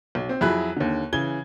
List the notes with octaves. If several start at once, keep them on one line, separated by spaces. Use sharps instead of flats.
B1
C4
F2 F#3 E4 G#4 B5 F#6
D#2 D3
C#3 E3 G#6 G7